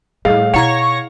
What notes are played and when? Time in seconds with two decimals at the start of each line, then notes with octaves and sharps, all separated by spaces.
0.25 A2 G3 G#4 D#5 F5
0.54 B2 D#4 E4 C#5 F#5 C#6 A#6